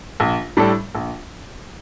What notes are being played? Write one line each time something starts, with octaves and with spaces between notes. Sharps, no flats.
A#1
A2 G3 D4 A4
A#1